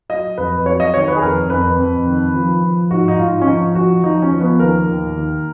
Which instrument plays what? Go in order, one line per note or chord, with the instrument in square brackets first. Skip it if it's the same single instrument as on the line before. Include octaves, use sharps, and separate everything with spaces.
[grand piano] F#3 D#5
F2 B4
F#3 C#5
D#5
D#3 C#5
B4
G#4
F2 A#4
F2 B4
F2
D#3
F3
F3
G#2 F#4
D#4
G#2 F4
C#4
F3 D#4
F3 F#4
F3 D#4
C#4
F3
B3
D#2 A#4
D#3
D#2